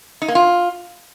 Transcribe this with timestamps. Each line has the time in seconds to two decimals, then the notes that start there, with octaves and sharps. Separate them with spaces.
0.22 D#4
0.28 A#3
0.35 F4